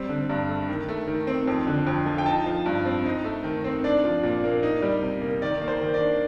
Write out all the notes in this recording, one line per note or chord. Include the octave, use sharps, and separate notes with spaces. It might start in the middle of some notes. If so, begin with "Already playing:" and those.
Already playing: G3 C4
D3
G2
A3
D#3
A3
D#3
C4
F2
D3
F2
F3
G5
D#4 A5
F3
G2
C4
D#4
A3
D#3
C4
D4 D5
F3
A#2
A#3
D#4
G3
C3
A#3
D#3 D5
A#3
C5
D#3
D5
D4